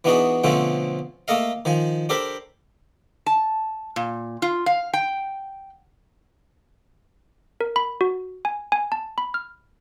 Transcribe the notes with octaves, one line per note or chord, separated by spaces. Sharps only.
E3 B3 D4 D#4 F#4 G#4
B2 D3 F3 A3 C4 C#4
A3 A#3 A4 D#5 F5
D#3 F3 G#5
D4 G4 A4 A#4 C5 B5
A5
A#2
F4
F5
G5
A#4
B5
F#4
G#5
G#5
A5
B5
F6